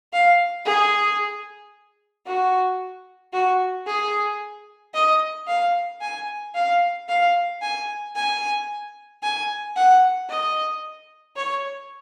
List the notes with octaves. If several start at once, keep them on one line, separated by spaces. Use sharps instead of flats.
F5
G#4
F#4
F#4
G#4
D#5
F5
G#5
F5
F5
G#5
G#5
G#5
F#5
D#5
C#5